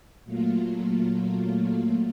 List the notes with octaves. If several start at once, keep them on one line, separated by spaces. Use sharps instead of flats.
A#2 F#3 A3 A#3 F4